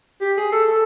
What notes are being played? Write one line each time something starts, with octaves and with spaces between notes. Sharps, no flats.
G4
G#4
A4
A4